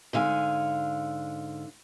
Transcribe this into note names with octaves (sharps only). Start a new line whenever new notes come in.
G#2 D3 F5 G#5